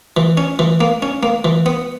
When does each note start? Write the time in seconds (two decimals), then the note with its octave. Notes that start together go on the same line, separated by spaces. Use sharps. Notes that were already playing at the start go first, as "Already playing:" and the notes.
0.17 E3
0.37 C#4
0.59 E3
0.81 A#3
1.02 C#4
1.23 A#3
1.45 E3
1.66 B3